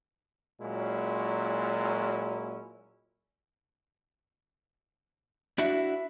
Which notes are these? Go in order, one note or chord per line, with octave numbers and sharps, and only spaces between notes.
A#2 F#3 G#3 C#4 E4
D4 E4 F#4 E5